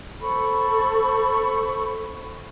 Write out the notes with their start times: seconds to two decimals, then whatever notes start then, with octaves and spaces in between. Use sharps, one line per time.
0.22 A4 C5 B5 C#6